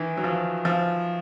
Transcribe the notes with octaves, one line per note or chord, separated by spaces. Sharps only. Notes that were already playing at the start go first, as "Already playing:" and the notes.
Already playing: D#3 E3
F#3
F3
F3